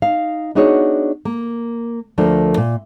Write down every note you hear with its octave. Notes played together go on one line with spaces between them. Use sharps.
D#4 F5
B3 D4 D#4 F#4 G#4 C#5
A#3
D2 F3 A3 D4 A#4
A#2